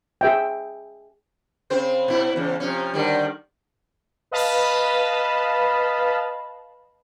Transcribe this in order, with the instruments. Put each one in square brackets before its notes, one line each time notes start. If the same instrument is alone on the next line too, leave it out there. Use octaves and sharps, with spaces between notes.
[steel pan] G#4 E5 G5
[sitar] C#3 C4 C5
B2 E4
E2 C#3
C3 F3 C#4
D3 D#3 G3
[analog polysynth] B4 D#5 F5 A5 B5